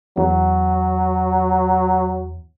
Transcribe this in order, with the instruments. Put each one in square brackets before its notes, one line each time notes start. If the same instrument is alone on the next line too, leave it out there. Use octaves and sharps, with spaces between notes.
[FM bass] E2 [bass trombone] F#3